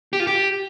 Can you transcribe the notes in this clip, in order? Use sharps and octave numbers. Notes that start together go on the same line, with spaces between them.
G4
F4
G4